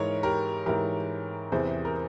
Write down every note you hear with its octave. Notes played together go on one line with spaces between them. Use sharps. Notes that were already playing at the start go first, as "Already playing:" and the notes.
Already playing: G#2 E3 A#4 C#5
G4 A#4
G#2 E3 G4 A#4
E2 C3 E3 G#4 C5
A#4